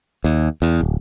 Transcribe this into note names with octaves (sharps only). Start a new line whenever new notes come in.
D#2
E2
D1